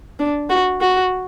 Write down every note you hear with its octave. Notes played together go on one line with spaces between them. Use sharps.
D4
F#4
F#4